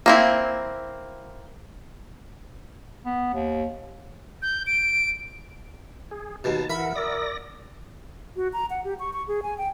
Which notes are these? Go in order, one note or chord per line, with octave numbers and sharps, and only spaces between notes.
A#3 C4 E4
B3
D#2
G6
D7
G#4
D#2 B2 A5
E3 A#4 E5 F#5 B5
A#4 D5 D#6 E6 A#6
F#4
A#5
F#5
G4
C#6
C#6
G#4
G#5
G5